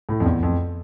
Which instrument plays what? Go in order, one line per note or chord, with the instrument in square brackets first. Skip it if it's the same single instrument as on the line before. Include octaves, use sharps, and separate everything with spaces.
[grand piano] A2
F2
E2
F2